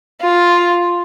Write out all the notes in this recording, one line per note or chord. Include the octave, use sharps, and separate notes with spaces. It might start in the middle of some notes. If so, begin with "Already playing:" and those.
F4